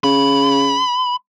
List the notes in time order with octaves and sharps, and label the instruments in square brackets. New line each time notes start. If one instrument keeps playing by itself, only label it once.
[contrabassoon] C#3 [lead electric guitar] B5